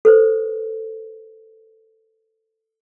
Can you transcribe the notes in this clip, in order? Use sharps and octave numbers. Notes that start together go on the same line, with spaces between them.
A4 B4 C5